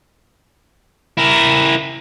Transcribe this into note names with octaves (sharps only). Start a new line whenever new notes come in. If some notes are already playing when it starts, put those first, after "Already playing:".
E4 A#4